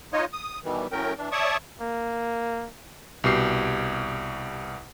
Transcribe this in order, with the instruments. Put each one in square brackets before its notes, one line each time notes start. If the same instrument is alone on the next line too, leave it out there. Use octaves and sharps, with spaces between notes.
[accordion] D#4 F4 C#5 D#5
D#6
B2 D#3 E3 G3
A2 F#3 C#4 A#4 G5
E3 D4
C#5 D5 E5 A5 C#6 D#6
[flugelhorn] A#3
[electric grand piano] C2 B2 G4 C7